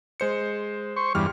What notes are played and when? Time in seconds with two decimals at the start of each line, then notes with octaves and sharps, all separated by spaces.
0.20 G#3 C5 C#7
0.97 C5 C#6
1.15 E2 G2 G3 F6